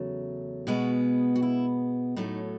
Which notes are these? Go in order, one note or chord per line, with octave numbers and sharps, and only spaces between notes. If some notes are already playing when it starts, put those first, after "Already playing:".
Already playing: E2 C#3 F#3 A3
B2 G#3 B3 F#4
F#4
E4
A2 F#3 A3 D#4